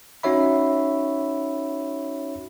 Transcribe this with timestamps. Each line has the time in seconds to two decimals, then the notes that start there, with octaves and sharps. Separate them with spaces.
0.23 C#4 D#4 F#4 C#5 E5 B5